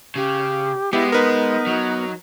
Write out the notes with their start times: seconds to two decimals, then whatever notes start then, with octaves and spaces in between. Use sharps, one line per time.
0.16 C#3 G4
0.93 G#3 B3 E4 G4
1.12 D#4 A#4 B4
1.67 F#3